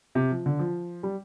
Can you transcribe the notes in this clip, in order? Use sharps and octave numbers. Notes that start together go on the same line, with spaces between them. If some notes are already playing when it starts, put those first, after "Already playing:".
C3
F3
D3
F3
G3